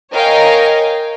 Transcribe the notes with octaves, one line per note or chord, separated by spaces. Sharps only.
A#4 C#5 D#5 F5 G5 G#5